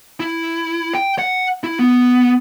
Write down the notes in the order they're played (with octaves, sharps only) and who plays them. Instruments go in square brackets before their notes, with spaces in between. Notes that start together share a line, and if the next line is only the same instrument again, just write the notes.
[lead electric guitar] E4
G5
F#5
E4
B3